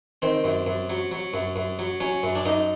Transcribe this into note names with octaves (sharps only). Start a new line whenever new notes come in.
D#3 C4
F#2
F#2
F#3
F#3
F#2
F#2
F#3
F#3 C#4
F#2
D4
F#2 D#4